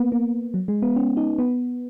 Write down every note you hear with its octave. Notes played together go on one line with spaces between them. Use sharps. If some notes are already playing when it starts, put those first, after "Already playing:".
Already playing: A#3 B3
A#3
F#3
G#3
B3
C#4
D#4
B3